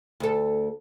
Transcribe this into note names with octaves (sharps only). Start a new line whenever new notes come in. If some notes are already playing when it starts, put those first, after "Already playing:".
D2 A4